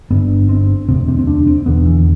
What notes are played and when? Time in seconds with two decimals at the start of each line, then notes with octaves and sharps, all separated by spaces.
0.10 G1 G2 D3 B3
0.49 C4
0.88 E1 D2 C3 C4
1.08 C4
1.19 C4
1.27 D4
1.47 C4
1.66 E1 E2 D3 B3
1.86 E3